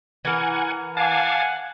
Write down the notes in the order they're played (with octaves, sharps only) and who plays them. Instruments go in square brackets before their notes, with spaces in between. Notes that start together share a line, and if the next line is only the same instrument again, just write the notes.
[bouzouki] E3 A#4 [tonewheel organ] F#5 G#5
[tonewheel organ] F5 A5 D6 [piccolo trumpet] F#5 [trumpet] G#5